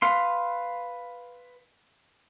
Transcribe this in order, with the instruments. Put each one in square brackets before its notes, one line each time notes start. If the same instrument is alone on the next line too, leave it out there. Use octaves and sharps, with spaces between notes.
[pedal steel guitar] B4 F5 C6